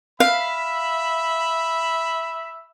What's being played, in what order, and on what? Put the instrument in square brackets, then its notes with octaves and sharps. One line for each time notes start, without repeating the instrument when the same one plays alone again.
[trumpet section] E5 B5 [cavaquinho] F5